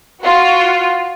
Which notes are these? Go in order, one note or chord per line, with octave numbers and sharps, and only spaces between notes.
F4 F#4